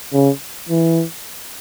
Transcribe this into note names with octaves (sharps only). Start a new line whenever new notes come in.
C#3
E3